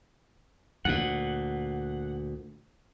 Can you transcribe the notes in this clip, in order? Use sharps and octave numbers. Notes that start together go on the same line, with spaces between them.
D2 A#2 F#5